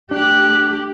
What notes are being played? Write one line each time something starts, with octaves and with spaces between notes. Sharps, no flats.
A3 D4 G4 F#6